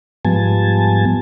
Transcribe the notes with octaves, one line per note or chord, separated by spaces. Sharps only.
G#2 F3 G3 B3 G#5 A5